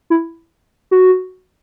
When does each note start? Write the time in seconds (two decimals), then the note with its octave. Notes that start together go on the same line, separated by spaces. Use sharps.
0.10 E4
0.91 F#4